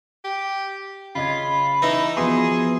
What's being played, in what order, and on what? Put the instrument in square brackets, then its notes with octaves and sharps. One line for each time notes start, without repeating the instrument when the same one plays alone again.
[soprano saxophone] G4
[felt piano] C#3 D#5 G#6 [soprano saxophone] F4 [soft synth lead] B5
[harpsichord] E3 C#4 E4 [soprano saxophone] D#4
[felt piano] F3 F#4 C6 [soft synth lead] B3 [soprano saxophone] G#4